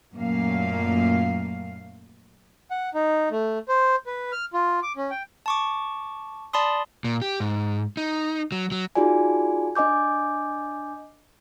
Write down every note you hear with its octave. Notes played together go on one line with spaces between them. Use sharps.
F#2 A#2 A3 A#3 F5
F#5
D#4
A3
C5
B4
F6
F4
D6
C#4
G5
A5 C#6 D6
D5 A5 B5 C6 D#6
A#2
G4
G#2
D#4
F#3
F#3
D#4 F4 F#4 G#4 D5 G#5
D4 D#5 G#5 D6 G6